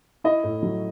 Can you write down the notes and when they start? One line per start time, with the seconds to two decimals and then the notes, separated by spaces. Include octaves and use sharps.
0.24 E4 D#5
0.44 A2
0.63 F#3